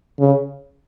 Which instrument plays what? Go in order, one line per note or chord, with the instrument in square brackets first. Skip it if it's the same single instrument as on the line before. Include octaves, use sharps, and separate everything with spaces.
[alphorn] C#3